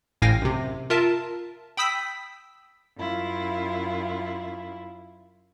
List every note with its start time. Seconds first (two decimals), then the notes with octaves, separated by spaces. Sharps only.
0.22 A1 A2 F5 G5 G#5 A#6
0.42 F#2 C3
0.90 F4 A#4 E5 A5
1.77 G5 B5 D#6 E6 B6
2.97 F#2 E4 F4